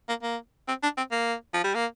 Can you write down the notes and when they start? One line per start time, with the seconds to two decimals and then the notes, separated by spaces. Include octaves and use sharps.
0.09 A#3
0.23 A#3
0.68 C4
0.83 D4
0.97 C4
1.12 A#3
1.54 F3
1.64 G3
1.75 A#3